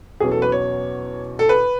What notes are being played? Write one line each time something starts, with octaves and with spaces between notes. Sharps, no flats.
E2 B2 F#3 C#4 G#4
A4
B4
C#5
A4
B4